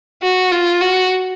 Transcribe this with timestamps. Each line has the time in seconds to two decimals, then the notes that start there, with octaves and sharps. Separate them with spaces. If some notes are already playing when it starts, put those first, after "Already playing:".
0.23 F#4
0.52 F4
0.81 F#4